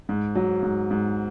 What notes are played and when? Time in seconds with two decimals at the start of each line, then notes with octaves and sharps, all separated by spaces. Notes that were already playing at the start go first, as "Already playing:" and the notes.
0.09 G#2
0.35 F#3
0.63 G#2
0.91 G#2